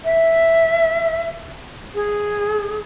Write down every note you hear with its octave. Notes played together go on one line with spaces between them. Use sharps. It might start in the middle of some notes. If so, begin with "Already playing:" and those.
E5
G#4